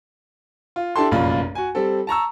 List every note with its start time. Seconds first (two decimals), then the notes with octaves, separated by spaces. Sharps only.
0.76 F4
0.96 D4 E4 G4 A4 A5 C6
1.11 F1 A#1 F#2 F4 B5
1.55 F#4 G#5
1.75 G3 C4 A4
2.07 A5 A#5 C#6 E6